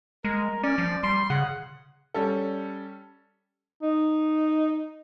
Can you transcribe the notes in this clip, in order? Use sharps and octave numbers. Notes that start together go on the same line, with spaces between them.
G#3 A#4
C#4 D5
F3
G3 C6
C#3 F#5
G3 C#4 A4
D#4